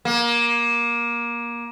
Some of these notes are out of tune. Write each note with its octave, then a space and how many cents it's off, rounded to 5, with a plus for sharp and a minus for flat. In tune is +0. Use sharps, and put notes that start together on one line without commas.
A#3 +20